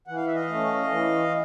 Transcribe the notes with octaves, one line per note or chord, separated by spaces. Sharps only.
E3 F#5
F5
E5
D#5 F5
A3 C#4
E3